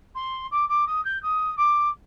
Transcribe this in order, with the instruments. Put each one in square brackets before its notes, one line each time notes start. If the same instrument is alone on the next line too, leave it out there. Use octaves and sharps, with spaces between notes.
[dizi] C6
D6
D6
D#6
G6
D#6
D6